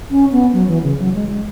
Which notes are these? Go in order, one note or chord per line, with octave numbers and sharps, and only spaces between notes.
C#4
B3
F#3
E3
C#3
F#3
G#3
G#3